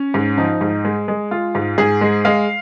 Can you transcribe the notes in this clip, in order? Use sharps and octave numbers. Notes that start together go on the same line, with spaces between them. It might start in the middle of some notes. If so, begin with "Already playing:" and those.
Already playing: C#4
G#2
F3 D#4
G#2
G#3
G#3
G#3 F4
G#2
G#2 G#4
G#3
G#3 F5